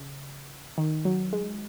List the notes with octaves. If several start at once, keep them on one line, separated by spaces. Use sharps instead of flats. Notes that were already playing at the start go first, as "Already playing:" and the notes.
Already playing: C#3
D#3
F#3
G#3